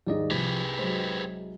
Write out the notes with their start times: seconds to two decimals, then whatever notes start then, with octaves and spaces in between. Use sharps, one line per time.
0.07 D#2 G#2 D#3 G3 D5 D#5
0.31 C2 F3 G4 G#4 B4
0.79 F#3 G#3 C5